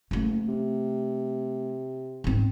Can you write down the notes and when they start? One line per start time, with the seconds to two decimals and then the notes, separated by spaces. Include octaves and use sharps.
0.11 F#1 A3 A#3
0.48 C3
2.24 G#2 C4